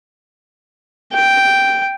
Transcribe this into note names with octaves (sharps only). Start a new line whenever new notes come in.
G5